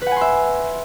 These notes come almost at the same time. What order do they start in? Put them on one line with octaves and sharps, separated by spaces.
B4 F#5 G#5 C6 E5